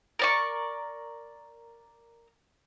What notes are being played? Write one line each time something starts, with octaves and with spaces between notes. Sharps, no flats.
A#4 D5 C#6